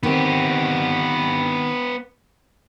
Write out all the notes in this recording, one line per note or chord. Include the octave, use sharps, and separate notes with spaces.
D#3 B3 C4 G4